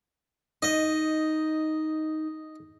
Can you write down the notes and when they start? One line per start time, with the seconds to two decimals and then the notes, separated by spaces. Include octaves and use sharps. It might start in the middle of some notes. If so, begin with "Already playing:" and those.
0.62 D#4 D#5